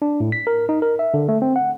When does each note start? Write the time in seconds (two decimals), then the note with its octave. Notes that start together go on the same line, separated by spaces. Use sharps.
0.02 D4
0.20 A2
0.32 B6
0.47 A#4
0.69 D#4
0.82 A#4
0.99 E5
1.14 D3
1.29 A3
1.42 C4
1.56 F#5